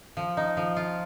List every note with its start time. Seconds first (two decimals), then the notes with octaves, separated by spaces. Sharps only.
0.17 F3
0.37 D#4
0.57 F3
0.77 F4